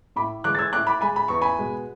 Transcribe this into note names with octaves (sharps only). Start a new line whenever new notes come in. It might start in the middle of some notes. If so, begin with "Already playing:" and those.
A2 B5 D6
E3 G#3 D6 F#6
A6
E6 G#6
A2 D6 F#6
B5 D6
G#3 G#5 B5
B5
E2 C#6
G#5 B5
B2 G#3